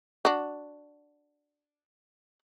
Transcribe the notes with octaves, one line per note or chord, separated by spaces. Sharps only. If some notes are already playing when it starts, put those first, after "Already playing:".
D4 F#4